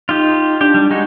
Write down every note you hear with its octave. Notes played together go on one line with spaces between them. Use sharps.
D#4 F4 G4
D4 G4
G3
G#3 D#4 F#4